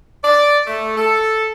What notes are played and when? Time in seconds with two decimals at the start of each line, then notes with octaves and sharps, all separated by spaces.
0.23 D5
0.67 A3
0.97 A4